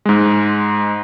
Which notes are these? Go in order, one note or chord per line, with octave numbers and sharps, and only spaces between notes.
G#2 G#3